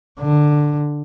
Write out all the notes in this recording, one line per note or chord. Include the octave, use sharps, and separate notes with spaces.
D3